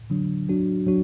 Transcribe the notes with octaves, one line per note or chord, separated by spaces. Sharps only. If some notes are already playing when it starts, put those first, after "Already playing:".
D3 F#3 D4
F#3 D4 F#4
F#3 D4 F#4